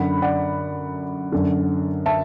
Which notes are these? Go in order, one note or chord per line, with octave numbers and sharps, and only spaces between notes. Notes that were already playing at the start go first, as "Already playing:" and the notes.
Already playing: F#2 D3 F#5 B5
D5 F#5
F#2 D3
E5 A5